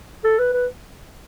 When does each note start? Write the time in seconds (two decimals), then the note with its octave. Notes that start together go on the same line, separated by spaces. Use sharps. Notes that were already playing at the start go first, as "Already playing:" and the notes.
0.24 A4
0.39 B4
0.53 B4